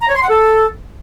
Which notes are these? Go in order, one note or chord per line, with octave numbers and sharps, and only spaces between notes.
A#5
C#5
C6
F#5
A4